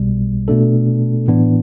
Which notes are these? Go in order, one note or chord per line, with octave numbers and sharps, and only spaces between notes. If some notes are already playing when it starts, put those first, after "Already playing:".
Already playing: B1 B2 G3
B2 A3 D4 A4
A2 E3 B3 D4